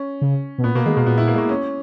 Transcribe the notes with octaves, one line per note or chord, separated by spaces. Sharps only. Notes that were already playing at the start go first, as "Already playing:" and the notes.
Already playing: C#4
C#3
B2
A#2 B3
B2 A#3
D#3 G#3
B2 A#3
A#2 B3
E4
A#3
G#3
A#3
C#4